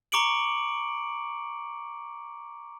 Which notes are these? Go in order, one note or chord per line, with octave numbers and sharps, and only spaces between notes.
A#5 C#6 D6 C#7 D7 F#7